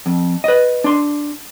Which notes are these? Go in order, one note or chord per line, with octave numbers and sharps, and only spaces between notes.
F2
B4 D#5
D4 C6